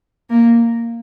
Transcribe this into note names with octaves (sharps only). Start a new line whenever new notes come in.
A#3